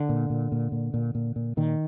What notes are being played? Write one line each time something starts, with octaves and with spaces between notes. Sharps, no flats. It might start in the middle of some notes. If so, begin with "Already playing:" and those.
Already playing: D3
A#2
A#2
A#2
A#2
A#2
A#2
A#2
A#2 D#3